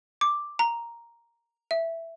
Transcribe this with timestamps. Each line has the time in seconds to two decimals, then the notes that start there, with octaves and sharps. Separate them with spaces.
0.21 D6
0.59 A#5
1.71 E5